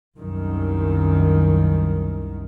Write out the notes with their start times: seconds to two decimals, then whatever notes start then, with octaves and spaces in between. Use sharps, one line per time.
0.19 C2 F#2 D#3